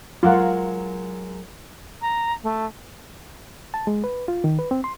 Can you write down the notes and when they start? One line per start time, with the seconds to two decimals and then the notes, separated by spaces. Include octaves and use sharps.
0.23 F#3 G#3 F4 A#4 F#5
2.02 A#5
2.43 A3
3.74 A5
3.87 G#3
4.04 B4
4.28 F4
4.44 D#3
4.59 B4
4.71 C4
4.84 C6